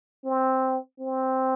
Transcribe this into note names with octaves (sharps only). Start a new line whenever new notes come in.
C4
C4